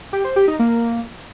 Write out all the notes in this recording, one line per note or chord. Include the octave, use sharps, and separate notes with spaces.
G4
C5
G4
D#4
A#3